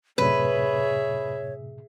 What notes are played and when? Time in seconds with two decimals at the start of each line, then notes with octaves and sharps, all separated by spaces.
0.18 F#2 A2 C3 G#4 B4 C#5 E5